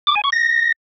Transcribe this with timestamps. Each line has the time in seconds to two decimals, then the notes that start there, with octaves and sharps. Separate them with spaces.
0.07 D6
0.16 G#5
0.24 C#6
0.32 A#6